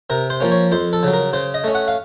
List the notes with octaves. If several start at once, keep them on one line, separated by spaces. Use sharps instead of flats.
C3 A#4
C5
F3 A#3 C#4
C#5
F2 C5
A4
C#3 F#3
A#4
C#3 C5
D#5
A3 C#4
F#5
F5